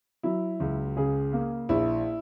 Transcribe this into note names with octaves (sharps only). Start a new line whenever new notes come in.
F#3 E4
C#2
C#3 G#4
A#3
A#1 E4